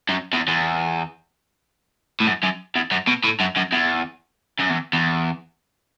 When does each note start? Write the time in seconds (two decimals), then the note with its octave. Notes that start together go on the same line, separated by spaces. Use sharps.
0.09 F#2
0.33 E2
0.48 E2
2.20 A2
2.27 F#2
2.43 F#2
2.75 E2
2.91 F#2
3.07 B2
3.24 A2
3.40 F#2
3.56 F#2
3.72 E2
4.59 F#2
4.69 E2
4.93 E2